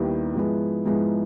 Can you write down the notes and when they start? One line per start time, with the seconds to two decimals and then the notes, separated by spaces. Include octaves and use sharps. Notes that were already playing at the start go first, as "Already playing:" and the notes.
Already playing: D#2 D#3 G3 B3 E4
0.35 G#2 F3 G#3 B3 E4
0.86 G#2 F3 G#3 B3 E4